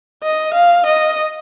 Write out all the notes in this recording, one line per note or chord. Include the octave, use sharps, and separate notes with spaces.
D#5
F5
D#5